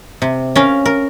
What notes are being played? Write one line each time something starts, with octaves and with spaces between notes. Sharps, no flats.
C3
C#4 A#4 F5
A#4